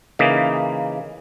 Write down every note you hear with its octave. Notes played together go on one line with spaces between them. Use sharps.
C#3 E3 A#3 D#4